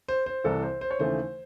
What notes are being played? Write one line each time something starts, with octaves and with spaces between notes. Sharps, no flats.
C5
C5
C2 C3 E3 A4
C5
C5
C#5
D#2 C#3 E3 A3 C5